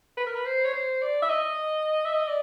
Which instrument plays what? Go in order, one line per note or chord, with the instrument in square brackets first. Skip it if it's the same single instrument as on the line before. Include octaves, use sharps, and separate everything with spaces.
[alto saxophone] B4
A#4
B4
C5
C#5
C5
D5
E5
D#5
E5
D#5
D5